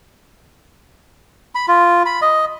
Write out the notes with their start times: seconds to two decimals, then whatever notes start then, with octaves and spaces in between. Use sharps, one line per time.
1.55 B5
1.68 F4
2.06 B5
2.22 D#5